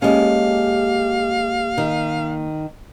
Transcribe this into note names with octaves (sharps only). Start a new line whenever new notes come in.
G#3 A#3 C#4 G4 A4 F5
D#3